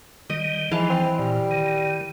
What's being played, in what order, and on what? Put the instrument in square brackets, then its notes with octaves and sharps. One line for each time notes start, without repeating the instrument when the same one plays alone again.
[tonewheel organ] D#3 G3 [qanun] D#5
[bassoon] G#2 [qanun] E3 A5 [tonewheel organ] F3
[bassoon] C4
[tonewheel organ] A#2 [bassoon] G3
[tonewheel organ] D#3